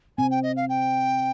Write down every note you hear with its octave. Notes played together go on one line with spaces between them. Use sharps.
C3 C4 G#5
G5
D#5
F5
G5